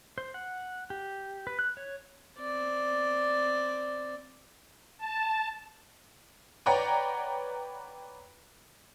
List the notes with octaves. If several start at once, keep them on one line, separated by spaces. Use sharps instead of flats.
C5
F#5
G4
B4
F#6
C#5
C4 D5
A5
B4 C#5 D5 F#5 G5 A#5